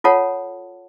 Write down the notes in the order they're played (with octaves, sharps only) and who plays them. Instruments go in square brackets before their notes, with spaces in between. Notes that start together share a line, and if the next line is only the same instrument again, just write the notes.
[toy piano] F4 A4 C#5 F#5 A5